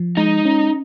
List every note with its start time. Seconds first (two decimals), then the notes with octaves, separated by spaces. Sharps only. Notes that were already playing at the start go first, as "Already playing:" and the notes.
Already playing: F3
0.17 G#3 D#4
0.45 C#4